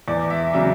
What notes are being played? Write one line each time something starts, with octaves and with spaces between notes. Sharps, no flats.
E2 D5
E5
C#3 F#3 E5